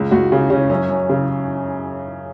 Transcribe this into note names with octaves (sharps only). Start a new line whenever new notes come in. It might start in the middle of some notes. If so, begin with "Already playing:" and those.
Already playing: C#2
C#2 F#4
C#3
C#3 C#4
F#2 C#4
F#2
C#3